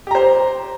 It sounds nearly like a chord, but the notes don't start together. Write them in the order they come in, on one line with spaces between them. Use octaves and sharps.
G4 A#5 C5